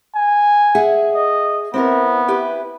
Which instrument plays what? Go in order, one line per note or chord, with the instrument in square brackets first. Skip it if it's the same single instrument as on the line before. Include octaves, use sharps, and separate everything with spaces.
[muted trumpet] G#5
[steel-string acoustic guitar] G#4 E5 F#5
[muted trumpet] D#5
[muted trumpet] B3 [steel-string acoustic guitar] C4 E4 A#4
[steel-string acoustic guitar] E4 G4 B4